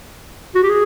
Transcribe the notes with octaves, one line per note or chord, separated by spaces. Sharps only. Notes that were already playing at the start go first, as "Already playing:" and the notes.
F#4
G4
G#4